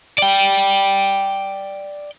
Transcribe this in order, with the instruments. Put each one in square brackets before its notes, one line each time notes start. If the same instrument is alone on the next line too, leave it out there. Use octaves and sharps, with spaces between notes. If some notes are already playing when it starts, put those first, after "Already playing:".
[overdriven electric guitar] D5 G5